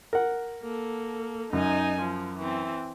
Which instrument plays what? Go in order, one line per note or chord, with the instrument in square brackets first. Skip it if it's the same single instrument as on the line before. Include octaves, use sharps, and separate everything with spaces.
[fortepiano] A#4 F#5
[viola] A#3 A4
[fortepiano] F#2 [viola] D#4 G#5
[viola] F3
E3 C4